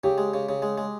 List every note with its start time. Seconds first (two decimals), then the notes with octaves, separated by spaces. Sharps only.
0.04 C#3 G4
0.18 G#3
0.34 C#3
0.49 C#3
0.62 G#3
0.78 G#3